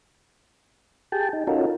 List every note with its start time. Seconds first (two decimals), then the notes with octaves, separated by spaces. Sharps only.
1.12 G4 G#4 G5 A5
1.33 D#4
1.47 C#4 D#4 F4 F#4 A4 A#4